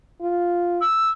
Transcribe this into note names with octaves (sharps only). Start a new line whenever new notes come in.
F4
E6